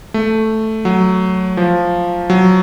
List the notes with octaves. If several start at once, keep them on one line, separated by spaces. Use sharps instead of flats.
A3
F#3
F3
F#3